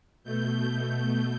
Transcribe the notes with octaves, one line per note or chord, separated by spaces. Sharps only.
B2 A3 G6
G6